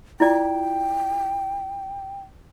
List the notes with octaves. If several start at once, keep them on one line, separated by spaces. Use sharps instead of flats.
E4 F4 D5 G5